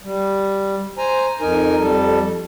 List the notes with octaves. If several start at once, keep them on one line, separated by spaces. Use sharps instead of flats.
G3
C5 G#5 A#5
F2 D#4 A#4 G#5
F2 G3 A4